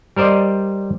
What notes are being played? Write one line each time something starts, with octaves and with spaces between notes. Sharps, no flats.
G3 A#4 C5 D5 D#5